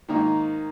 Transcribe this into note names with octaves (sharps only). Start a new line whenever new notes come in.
G#2 D#3 A#3 D#4